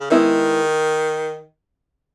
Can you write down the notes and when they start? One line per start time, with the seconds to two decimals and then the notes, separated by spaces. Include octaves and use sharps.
0.01 C#3
0.10 D#3 G#3 B3 E4